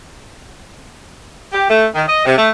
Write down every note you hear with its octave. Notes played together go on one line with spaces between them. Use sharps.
G4
A3
D#3
D#5
C3
A3